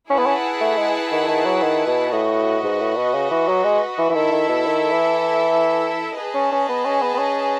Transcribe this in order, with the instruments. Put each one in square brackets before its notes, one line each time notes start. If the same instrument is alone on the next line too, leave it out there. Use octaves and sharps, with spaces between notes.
[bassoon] C#4 [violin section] E4 G#4 B4 F#5 A5
[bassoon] B3
C#4
A3
G#3
D#3
D#3
F#3
D#3
B2
[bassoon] A2 [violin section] F#4 B4 D#5
[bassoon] G#2
A2
B2
C#3
E3
F#3
G#3
E3
E3
[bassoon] D#3 [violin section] E4 A4 E5
[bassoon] D#3
B2
D#3
E3
[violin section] G#4 B4 D#5 A5
[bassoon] C#4
C#4
B3
C#4
B3
B3
C#4